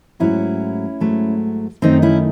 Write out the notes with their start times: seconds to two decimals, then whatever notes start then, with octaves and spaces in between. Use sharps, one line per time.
0.20 G#2 F#3 A3 C#4 E4
1.00 G#2 F#3 A3
1.82 F#2 D#3 A3 C4 D#4
2.02 C#4 E4